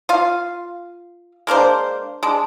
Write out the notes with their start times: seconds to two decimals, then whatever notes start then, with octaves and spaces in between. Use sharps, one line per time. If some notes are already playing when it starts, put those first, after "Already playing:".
0.09 F4 F5
1.47 G#3 A#3 D4 C5
2.23 G#3 D4